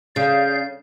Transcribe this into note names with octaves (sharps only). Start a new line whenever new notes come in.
C#3 D5 F5 G6